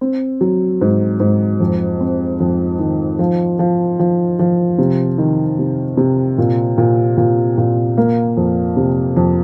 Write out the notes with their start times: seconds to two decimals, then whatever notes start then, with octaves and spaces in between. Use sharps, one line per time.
0.01 C4
0.41 F#3
0.81 G#2
1.20 G#2
1.60 F2
2.00 C4
2.40 F2
2.79 D#3
3.19 F3
3.59 F3
3.99 F3
4.39 F3
4.79 C3
5.18 D#3
5.59 C3
5.97 C3
6.38 A#2
6.78 A#2
7.17 A#2
7.58 A#2
7.98 A#3
8.37 F2
8.77 C3
9.16 F2